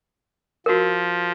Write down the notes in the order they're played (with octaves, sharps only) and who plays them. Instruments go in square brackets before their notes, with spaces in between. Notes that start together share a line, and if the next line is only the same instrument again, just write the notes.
[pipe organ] F3 [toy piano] F#4 A#4